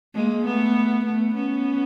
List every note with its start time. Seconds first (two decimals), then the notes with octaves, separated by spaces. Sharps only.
0.14 G#3 A#3
0.45 A3 B3
1.05 A3 B3
1.34 B3 C#4